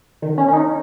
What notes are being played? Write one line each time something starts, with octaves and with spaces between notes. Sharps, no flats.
D#3
C#4
C#4
D#4